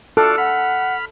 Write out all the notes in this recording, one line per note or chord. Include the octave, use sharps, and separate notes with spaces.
F4 F#4 A4 D5
F#5 B5 F6